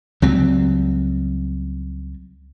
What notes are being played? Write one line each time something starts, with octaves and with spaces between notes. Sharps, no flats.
C#2 F#3 G3 C4